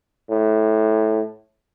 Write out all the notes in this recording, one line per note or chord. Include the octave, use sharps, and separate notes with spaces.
A2